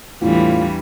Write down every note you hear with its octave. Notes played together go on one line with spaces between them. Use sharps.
E2 A2 E3 G3 D4 F4